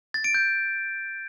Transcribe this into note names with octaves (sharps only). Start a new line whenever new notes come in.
A6
D7
G6